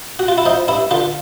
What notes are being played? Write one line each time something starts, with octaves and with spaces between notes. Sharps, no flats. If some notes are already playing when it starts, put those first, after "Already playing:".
F#4
F4
E4
F3 D#4
G2 E4
D3 F4